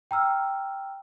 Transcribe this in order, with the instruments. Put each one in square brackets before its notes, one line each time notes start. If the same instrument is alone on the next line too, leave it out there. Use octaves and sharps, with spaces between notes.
[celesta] G5 A#5 E6 F6